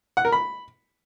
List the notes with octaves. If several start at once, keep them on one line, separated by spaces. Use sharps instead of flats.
F#5
A#4
B5